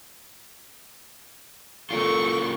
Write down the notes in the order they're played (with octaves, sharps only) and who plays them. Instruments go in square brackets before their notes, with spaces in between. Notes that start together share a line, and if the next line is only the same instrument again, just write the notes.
[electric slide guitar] C#3 A#3 F4 [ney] A4 [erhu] C#6